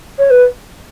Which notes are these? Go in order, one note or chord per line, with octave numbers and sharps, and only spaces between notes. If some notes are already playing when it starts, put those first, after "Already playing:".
C#5
B4